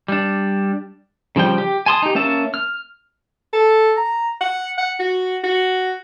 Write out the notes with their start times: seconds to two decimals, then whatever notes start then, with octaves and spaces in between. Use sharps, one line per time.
0.08 G3 D4
1.36 C#3 F3 G3 G5
1.58 G4
1.86 G#5 A5 C6 D6 D#6
2.02 D#4 G4
2.15 A#3 C#4 E5 A5
2.54 F6
3.53 A4
3.97 A#5
4.41 F#5
4.78 F#5
4.99 F#4
5.44 F#4